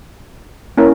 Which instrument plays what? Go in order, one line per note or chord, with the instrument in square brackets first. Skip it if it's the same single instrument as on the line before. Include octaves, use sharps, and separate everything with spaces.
[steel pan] A#3 C#4 E4 A#4